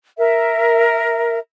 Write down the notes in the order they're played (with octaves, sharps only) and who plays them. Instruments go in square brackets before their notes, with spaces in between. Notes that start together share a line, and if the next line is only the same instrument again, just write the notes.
[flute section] A#4 E5